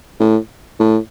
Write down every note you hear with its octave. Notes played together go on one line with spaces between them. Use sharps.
A2
A2